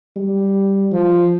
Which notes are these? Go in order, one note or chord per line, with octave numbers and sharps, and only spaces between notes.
G3
F3